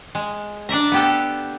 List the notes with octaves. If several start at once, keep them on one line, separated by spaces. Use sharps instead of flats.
G#3
D4 D5 E5 A#5
B3 G4 A4